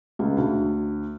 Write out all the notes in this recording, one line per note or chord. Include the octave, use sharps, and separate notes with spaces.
C#2
D2